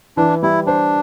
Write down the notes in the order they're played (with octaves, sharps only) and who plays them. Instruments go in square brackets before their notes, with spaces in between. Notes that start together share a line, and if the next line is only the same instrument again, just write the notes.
[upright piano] E3 [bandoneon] D4
[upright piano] G3 [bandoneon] E4
[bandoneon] D4 [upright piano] C5